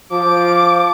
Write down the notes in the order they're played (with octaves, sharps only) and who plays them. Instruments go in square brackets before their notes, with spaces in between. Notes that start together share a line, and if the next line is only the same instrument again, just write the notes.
[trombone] F3 [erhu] D6